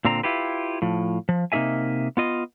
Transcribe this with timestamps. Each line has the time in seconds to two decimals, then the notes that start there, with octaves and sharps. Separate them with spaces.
0.05 A#2 D3 C4 A#5
0.23 E4 F4 G4 B4
0.82 A2 F3
1.29 F3
1.52 C3 A#3 D#4 G#4 E5 G#5
2.17 B3 F4 D#5